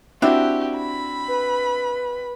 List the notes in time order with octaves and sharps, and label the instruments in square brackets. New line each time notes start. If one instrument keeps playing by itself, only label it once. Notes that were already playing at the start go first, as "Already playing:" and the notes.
[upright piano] C4 E4 F#4 [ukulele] D4 [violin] G4
[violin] B5
[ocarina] B4